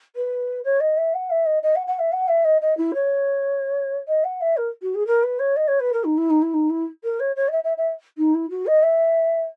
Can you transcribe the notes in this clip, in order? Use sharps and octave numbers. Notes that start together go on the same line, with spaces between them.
B4
C#5
D#5
E5
F#5
E5
D#5
D#5
F#5
F#5
E5
F#5
E5
D#5
D#5
E4
C#5
D#5
F#5
E5
A#4
F#4
G#4
A#4
B4
C#5
D#5
C#5
B4
A#4
D#4
E4
D#4
E4
D#4
E4
A#4
C#5
C#5
D#5
E5
E5
E5
D#4
E4
F#4
D#5
E5